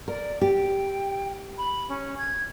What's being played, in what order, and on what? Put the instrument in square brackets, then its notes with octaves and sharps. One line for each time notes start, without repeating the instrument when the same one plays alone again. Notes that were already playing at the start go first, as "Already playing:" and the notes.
[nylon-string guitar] A#4 [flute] D5
[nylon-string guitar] G4 [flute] G5
[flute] B5
C#4
G#6